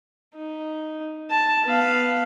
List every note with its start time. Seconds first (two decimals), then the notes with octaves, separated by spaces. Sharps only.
0.35 D#4
1.30 A5
1.65 B3 F5